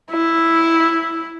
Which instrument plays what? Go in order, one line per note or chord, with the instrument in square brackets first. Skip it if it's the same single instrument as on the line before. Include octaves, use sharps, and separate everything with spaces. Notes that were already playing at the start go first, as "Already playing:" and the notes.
[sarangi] E4